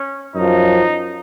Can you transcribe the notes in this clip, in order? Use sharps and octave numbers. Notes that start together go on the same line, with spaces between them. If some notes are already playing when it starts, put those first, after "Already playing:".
Already playing: C#4
F#2 F3 D#4